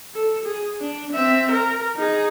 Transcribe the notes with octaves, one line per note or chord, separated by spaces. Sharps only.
A4
G#4
D4
C4 E5
A#4
D#4 G#4